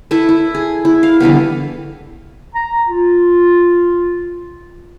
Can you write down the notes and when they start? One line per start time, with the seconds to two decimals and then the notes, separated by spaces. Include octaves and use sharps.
0.11 E4 A4 B4 E5
0.29 E4
0.55 G#4
0.85 E4
1.03 F5
1.20 D3 E3 G3 B3
2.55 A#5
2.87 F4